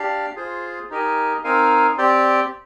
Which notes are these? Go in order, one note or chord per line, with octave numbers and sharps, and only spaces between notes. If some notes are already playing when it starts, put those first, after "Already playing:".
Already playing: D4 G4 D5 F5
F4 G#4 C5
D#4 G4 A#4 D#5 G#5
C4 D#4 A#4 F5 G#5
C4 G4 D5 G5